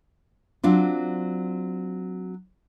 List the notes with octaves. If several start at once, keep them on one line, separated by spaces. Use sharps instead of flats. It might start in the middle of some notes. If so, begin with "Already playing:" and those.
F#3 C4 D4 F4